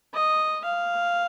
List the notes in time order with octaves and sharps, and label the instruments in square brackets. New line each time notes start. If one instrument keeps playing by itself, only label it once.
[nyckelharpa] D#5
F5